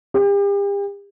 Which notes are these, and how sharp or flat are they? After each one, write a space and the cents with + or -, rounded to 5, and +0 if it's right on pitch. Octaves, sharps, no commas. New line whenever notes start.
G4 +40